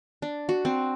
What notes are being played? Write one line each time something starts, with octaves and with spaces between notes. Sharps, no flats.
D4
F#4
C4